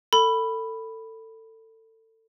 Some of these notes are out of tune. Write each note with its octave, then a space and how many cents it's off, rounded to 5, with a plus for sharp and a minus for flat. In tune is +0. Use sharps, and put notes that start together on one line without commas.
A4 +25 B5 +0